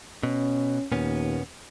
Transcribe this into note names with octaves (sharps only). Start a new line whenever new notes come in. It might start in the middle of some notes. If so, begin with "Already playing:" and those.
B2 C#4
D#2 A#2 B3 C#4